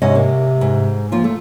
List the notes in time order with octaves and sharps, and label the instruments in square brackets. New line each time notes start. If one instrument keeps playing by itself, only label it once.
[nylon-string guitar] G#2 C#4 D#5 [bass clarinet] C3
[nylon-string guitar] A#3
G#2
[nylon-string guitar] F3 F4 [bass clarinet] A#3
[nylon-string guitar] A3